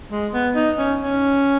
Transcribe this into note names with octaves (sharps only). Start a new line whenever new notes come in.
G#3
B3
D#4
C#4
C#4